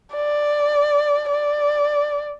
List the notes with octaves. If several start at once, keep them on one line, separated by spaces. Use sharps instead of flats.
D5
D5